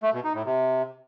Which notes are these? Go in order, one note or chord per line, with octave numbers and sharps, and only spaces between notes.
A3
B2
D#4
A2
C3